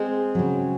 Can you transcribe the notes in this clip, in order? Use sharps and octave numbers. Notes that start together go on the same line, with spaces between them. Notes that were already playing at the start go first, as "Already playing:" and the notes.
Already playing: G#3 C4
C#3 F#3